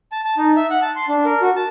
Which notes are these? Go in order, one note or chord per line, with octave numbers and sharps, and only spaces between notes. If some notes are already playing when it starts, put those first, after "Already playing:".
A5
A5
D#4
E5
F#5
A5
C6
D4
A#4
F#4
A5